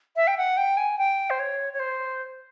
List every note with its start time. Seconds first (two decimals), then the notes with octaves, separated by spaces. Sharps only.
0.16 E5
0.27 G5
0.37 F#5
0.57 G5
0.77 G#5
0.98 G5
1.30 C5
1.40 C#5
1.73 C#5
1.80 C5